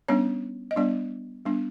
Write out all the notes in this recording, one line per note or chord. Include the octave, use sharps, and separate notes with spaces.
G3 B3 C#4 D4 C#5
D#5
G3 B3 D4 D5
G3 B3 D4